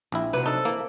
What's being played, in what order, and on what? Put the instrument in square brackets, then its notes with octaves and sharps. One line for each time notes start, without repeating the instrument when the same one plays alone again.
[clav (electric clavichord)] A#1 E4 [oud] C4
[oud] C3 F#3 G3 [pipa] B4
[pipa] D4 [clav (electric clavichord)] D#4 [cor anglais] A4
[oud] E3 [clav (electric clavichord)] A#3